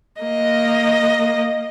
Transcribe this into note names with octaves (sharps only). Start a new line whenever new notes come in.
A#3 D#5